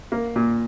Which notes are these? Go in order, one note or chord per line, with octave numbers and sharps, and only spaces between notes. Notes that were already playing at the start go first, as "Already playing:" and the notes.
A#3
A#2